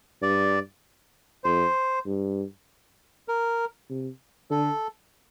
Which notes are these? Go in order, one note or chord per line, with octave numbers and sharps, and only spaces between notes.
G2 D5
F2 C5
G2
A#4
C3
D3 A4